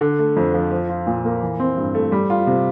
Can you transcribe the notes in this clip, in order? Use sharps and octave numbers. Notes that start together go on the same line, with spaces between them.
D3
A3
F2
F3
F3
F4
A#2
A#3
E3
C4
G2
A3
G3
F4
C3